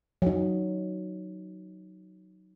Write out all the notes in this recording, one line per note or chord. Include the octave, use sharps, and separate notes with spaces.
F#3 D#4